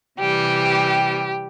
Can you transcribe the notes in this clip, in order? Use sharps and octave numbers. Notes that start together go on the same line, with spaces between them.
C3 E3 G3 G4